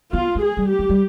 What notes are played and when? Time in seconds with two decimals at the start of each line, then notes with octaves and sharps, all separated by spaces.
0.13 B3 F4
0.35 G#3
0.43 G#4
0.57 G3
0.71 G4
0.79 G3
0.89 G3